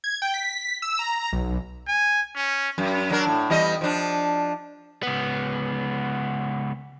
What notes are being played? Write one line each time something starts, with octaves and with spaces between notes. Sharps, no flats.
G#6
G5
B6
E6
A#5
B1
G#5
C#4
F#2
F#3 D4 A#4
A2
E2 G3 D#5
F3 D4
C#2 B3